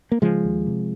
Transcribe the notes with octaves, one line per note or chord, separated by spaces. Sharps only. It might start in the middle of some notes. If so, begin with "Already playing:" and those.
A#3
C#3 F3 G#3
D#2
C3